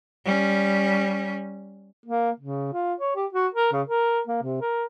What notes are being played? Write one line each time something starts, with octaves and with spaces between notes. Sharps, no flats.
G3 C#4
A#3
C#3
F4
C#5
G4
F#4
A#4
C#3
A#4
A#3
C3
A#4